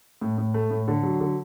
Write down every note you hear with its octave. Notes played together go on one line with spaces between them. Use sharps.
A2
A2
A3
A2
D3
F#3
D3